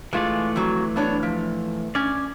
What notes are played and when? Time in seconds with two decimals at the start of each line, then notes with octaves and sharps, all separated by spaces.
0.13 E3 G#3 A3 F4 D5
0.56 F2 F#3
0.96 B3 D4 C#5
1.23 F3
1.95 C#4 D5 G#5